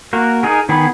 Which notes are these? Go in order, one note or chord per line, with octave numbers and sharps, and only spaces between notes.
A#3 F#4 A#4
D#4 G#4 A#4
D#3 B3 G#4 B5